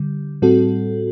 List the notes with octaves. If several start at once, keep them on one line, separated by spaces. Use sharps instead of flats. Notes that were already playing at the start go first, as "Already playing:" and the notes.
Already playing: D3 G3
A2 G3 C4 F#4 A4